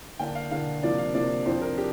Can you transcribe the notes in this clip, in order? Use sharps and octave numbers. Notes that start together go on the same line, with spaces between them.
D3 A#3 D4 G5
F5
D3 A#3 D4 F5
C3 F3 A#3 D4 D5
F5
C3 F3 A#3 D4 D5
F2 F3 D4 C5
A#4
D4 G4